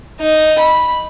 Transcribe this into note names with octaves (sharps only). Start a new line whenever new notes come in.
D#4
B5